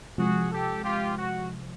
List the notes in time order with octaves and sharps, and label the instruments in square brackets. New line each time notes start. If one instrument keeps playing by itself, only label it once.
[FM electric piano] C3 F3 G#3 [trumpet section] F#4 G#4
[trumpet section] G4 A4
F4 G4
F#4